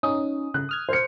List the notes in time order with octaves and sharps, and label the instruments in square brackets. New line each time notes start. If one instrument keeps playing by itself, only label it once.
[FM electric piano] C#4 D#4 [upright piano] D#6
[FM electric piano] C#3 [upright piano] F#6
[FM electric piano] D#6 F6 G#6
[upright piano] C5 C#7